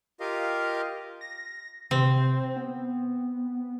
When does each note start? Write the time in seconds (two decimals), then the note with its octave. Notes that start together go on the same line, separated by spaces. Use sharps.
0.20 F4 G4 A#4 D#5 F5
1.21 A#6
1.91 C3 C4
2.56 B3